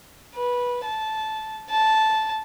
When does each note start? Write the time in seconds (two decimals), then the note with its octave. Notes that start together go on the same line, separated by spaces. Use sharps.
0.35 B4
0.85 A5
1.70 A5